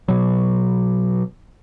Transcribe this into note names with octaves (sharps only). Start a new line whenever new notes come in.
B2 F#3